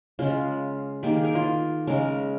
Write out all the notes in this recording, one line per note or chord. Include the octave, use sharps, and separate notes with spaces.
C#3 G#3 F4
D#3 A#3 G4
G#4
A#4
F4
C#3 G#3 A#4